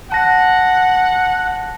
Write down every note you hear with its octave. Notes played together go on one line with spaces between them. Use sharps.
F#5 A5 A#6